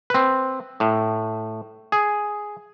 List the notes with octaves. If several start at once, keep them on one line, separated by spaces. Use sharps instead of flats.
C4 B4
A2
G#4